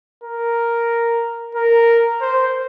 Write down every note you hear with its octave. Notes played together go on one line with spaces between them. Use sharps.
A#4
A#4
C5